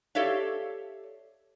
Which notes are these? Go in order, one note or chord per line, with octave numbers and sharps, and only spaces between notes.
G4 A4 C#5 D5 E5 F5